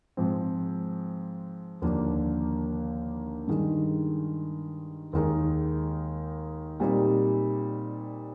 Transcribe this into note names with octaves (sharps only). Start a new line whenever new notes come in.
G#2 F3 C4
D#2 D3 F3 A#3 D4
G2 D#3 G#3 D#4
D#2 D#3 G#3 D#4
A#2 G3 C4 D#4